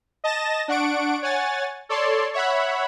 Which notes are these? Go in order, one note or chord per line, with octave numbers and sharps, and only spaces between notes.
D#5 A5 A6 A#6 E7
D4 F#5 C#6 D7
C#5 F#5 G#5 A6
A4 C#5 D5 A5 C6
C#5 E5 F#5 B5